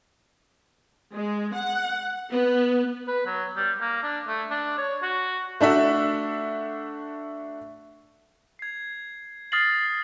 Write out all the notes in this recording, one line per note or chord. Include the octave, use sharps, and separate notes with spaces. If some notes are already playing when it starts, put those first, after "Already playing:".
G#3
F#5
B3
B4
F#3
G3
A#3
D4
A3
D4
C#5
F#4
A3 D4 F#4 E5
G#6 C7
D#6 F6 A6 A#6 C7 F#7